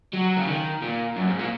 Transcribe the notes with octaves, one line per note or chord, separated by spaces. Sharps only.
F#3
C#3
D#3
A#2
F#2
G#2
A#2